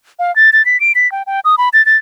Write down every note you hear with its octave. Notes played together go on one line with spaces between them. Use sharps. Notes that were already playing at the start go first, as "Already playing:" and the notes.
F5
A6
A6
B6
D7
B6
G5
G5
D#6
B5
A6
A6